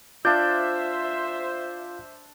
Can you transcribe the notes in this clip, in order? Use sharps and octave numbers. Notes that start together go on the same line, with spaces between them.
D4 F4 C5 D5 E5 F5 G6